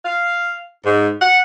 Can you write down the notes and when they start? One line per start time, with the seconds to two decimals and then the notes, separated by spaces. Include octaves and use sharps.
0.05 F5
0.85 G#2
1.20 F#5